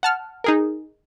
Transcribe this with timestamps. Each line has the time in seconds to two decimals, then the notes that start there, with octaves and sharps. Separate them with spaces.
0.03 F#5 A5 F6
0.44 D#4 G#4 A#4